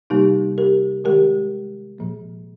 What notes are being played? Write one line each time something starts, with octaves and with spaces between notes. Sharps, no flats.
C3 G3 A#3 D#4 G4
G4 A#4
D#3 G#3 G4 A#4
A#2 F3 A#3